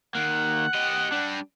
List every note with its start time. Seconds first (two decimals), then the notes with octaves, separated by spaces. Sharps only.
0.15 D#3 A#3 F#5
0.74 G4 D#5
1.12 G3 D4